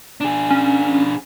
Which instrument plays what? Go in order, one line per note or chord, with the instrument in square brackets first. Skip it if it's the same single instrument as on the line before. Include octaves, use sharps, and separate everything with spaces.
[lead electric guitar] D4 G#4
[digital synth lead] C#4